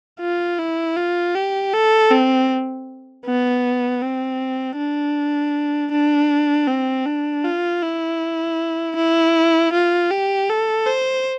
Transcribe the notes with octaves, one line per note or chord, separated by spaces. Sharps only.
F4
E4
F4
G4
A4
C4
B3
C4
D4
D4
C4
D4
F4
E4
E4
F4
G4
A4
C5